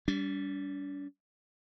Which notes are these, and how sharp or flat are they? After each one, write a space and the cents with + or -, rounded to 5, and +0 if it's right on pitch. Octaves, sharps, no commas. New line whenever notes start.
G3 +0 D4 -45